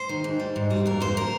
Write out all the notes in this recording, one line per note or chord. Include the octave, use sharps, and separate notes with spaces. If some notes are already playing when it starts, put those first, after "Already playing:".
Already playing: C5
D#3
G#2
G3
G#2
G3
F2 A#4
F2 C5
A#4